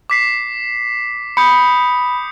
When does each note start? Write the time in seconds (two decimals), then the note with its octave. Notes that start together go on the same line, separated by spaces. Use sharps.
0.10 D6 B6 C7
1.37 B5 D#6 G6 C#7